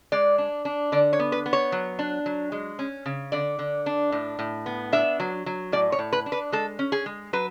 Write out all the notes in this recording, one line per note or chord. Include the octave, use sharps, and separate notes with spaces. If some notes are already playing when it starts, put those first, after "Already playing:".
G#3 D5
D4
D4
D3 D5
C#5
B3
B4
B3
C#5
F#3
D4
F#3
G#3
C#4
C#3
D3 D5
D3
D4
A2
A2
B3
D4 E5
F#3
F#3
A2 D5
C#5
A2
B4
D4
B4
G#3 A4
C#4
G#4
G#3
F#3 B4